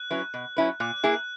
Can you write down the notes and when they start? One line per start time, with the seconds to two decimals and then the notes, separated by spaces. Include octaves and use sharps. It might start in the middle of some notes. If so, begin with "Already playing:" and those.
Already playing: F#6
0.10 F#3 C#4 E4 B4
0.34 B2
0.57 F#3 C#4 E4 B4
0.80 A#2 F#6
1.04 A#3 E4 G#4